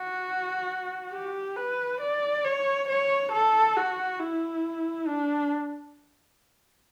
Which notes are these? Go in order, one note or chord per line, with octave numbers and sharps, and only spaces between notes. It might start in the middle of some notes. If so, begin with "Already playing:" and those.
Already playing: F#4
G4
B4
D5
C#5
C#5
A4
F#4
E4
D4